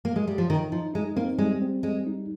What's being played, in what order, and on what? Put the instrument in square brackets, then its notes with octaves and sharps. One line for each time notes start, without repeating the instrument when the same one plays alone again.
[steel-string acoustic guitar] A#3
G#3
G3
F3
[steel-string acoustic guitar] D#3 [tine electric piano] D#4
[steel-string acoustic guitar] F3 [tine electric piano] D#4
[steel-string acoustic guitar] G#3 [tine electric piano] D#4
[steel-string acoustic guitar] A#3 [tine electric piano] C4
[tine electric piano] G3 [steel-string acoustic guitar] G#3
[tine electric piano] C4
[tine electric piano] G3 [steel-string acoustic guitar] G#3
[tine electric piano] D#4